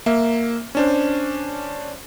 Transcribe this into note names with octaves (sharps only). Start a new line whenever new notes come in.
A#3 E5
C#4 D4 C5